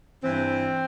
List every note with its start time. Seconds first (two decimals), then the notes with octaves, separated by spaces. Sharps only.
0.23 G2 E3 C4